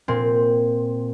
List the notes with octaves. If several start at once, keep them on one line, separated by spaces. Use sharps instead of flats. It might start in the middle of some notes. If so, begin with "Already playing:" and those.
A#2 C4